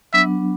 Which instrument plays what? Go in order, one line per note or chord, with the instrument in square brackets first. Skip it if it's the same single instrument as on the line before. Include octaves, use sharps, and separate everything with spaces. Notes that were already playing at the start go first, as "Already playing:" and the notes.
[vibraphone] F#3 B3 D4 [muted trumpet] E5